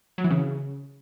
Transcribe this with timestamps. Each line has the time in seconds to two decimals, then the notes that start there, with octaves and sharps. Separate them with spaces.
0.18 F#3
0.24 E3
0.30 C#3